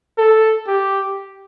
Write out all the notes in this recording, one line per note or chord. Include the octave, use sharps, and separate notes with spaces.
A4
G4